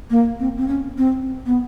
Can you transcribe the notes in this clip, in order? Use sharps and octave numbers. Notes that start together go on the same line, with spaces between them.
A#3
C4
C4
C#4
C4
B3